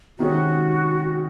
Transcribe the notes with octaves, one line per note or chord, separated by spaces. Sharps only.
C3 D#3 G#3 C#4 F#4